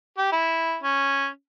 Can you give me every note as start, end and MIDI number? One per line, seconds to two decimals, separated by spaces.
0.17 0.30 67
0.31 0.76 64
0.83 1.27 61